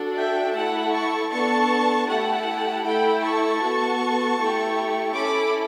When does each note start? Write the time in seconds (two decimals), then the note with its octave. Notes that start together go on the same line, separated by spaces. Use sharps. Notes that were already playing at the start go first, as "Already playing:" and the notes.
Already playing: D4 F#4 A4
0.15 E5 G5
0.53 A3 E4 A4 F#5 A5
0.92 A5 C#6
1.30 B3 D4 A4 A5 C#6
2.07 A3 E4 G4 F#5 A5
2.83 A3 E4 A4 G5 B5
3.22 A5 C#6
3.61 B3 F#4 A4
4.37 A3 E4 G4
5.14 C#4 E4 A4 B5 D6